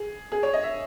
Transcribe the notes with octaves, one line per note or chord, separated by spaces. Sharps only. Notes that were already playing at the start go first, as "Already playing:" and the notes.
Already playing: G#4
G#4
C#5
D#5
E5